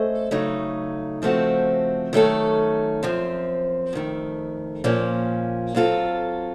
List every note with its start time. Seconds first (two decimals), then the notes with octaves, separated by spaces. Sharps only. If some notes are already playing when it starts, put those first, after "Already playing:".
Already playing: A3 C#4 A4 C5 D#5
0.31 C#3 F#3 A3 D#4
1.22 C#3 F3 A3 C4 F#4
2.13 D#3 F#3 A3 C#4 A4
3.03 F#2 F3 C4
3.93 F2 D#3 A3
4.84 A#2 F3 A#3 C#4
5.75 F#3 C4 F4 A4